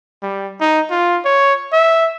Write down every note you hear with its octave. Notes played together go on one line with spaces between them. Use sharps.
G3
D#4
F4
C#5
E5